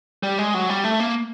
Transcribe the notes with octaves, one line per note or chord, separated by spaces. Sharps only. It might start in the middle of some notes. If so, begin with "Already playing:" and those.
G3
G#3
F#3
G3
A3
A#3